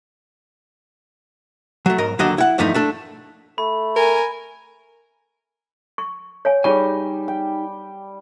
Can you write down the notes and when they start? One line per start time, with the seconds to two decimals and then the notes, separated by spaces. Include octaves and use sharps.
1.86 F#3 A3
1.98 B1 G#2 A#4 D#5
2.19 D#2 D3 F#3 D4 D#5
2.38 E4 F#5
2.58 E2 G2 F3 A3 D#4 E4
2.74 A3 D4 A4
3.58 A3 B5
3.96 A#4 G#5
5.98 C#6
6.45 C#5 F5 G#5
6.64 G3 D#4 G4 G#4 C#5 G#5 C#6
7.28 G5